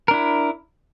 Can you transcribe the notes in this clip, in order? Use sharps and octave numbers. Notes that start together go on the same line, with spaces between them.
D4 E4 A#4